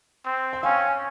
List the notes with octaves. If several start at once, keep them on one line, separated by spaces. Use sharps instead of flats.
C4
G5
C#4 F5 G#5